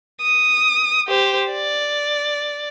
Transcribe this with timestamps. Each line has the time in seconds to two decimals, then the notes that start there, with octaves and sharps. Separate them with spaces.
0.21 D#6
1.08 G4 C5
1.52 D5